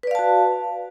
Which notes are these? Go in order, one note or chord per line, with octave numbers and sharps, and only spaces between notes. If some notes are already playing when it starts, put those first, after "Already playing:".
F#4 B4 D5 F5 A5